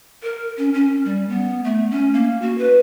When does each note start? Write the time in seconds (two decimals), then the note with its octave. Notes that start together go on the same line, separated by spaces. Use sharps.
0.23 A#4
0.58 C#4
0.74 C#4
1.05 G3
1.29 B3
1.64 A3
1.91 C#4
2.14 A#3
2.42 F#4
2.58 B4